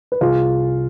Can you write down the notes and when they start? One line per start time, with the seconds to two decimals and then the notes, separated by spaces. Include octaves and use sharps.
0.12 B4
0.21 C2 F4 G#4